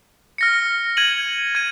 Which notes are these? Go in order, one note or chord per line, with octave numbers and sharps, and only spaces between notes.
F6 A#6 C#7
G#6 D#7 F#7
G#6 D#7